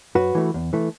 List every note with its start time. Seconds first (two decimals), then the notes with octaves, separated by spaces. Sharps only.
0.15 F#2 F#4 B4
0.35 E3 A3
0.54 E2
0.73 E3 A3